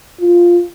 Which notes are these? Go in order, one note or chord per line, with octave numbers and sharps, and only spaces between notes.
F4